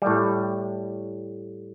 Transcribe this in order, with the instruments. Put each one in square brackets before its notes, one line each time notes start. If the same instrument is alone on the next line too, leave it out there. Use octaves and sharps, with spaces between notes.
[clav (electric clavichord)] A2 G3